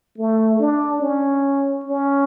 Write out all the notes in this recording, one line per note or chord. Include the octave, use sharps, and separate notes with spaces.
A3
D4
C#4
C#4